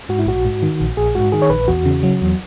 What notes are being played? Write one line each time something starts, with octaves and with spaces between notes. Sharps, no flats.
G#2 F#4
E4
A#1 F#4
G#2
D#3
A#1
A#1 G#4
G#2 F#4
D#3 G#4
C#5
A#1 B4
E2 F#4
C#3
F#3
E2